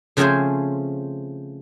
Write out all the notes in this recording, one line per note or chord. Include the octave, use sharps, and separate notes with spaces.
C#3 F3 A3 C4 G#4 C5